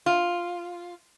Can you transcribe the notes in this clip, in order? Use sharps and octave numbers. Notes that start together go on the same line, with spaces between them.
F4